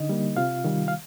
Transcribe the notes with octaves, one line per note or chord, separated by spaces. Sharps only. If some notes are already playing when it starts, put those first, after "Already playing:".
Already playing: D3 D#4 D#5
G3 A#3
C3 F4 F5
D#3 G3
F5